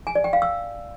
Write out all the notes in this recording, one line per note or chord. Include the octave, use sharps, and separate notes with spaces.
G#5
D5
G5
F5
E6